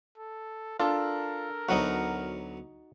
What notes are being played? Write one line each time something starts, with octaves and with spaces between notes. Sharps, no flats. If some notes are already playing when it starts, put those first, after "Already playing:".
A4
D4 F4 A4 A#4
D2 F#3 B3 D#4 F#4